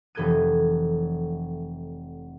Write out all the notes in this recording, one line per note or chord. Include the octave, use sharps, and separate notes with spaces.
F1 E3 A4 G6 G#6 D#7